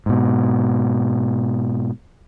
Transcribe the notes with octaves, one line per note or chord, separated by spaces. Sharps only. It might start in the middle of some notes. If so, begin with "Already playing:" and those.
G#2 B2